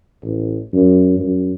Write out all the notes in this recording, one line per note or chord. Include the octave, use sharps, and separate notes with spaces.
A1
F#2
F#2